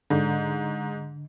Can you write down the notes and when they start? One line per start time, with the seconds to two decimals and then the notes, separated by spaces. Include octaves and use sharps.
0.10 G#2 D3